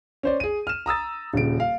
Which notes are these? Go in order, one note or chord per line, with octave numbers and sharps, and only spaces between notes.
C#4 C5 D5
G#4 D#7
F6 E7
A#5 D#6 E6 A6
D#1 C#3 D7
F5